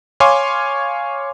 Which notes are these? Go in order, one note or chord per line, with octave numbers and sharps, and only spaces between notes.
C#5 F5 G#5 C6 D6